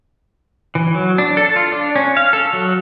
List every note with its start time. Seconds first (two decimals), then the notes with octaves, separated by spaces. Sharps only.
0.75 E3
0.94 F#3
1.18 D4
1.37 A4
1.56 F4
1.72 D4
1.96 C#4
2.17 F5
2.33 A4
2.53 F#3